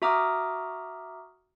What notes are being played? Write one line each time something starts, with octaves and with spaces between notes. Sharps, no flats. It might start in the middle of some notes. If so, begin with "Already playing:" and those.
F#4 E5 A#5 D6 D#6 F6